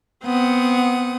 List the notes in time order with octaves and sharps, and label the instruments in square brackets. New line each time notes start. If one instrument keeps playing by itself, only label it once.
[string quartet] B3 C4 F#5 D#6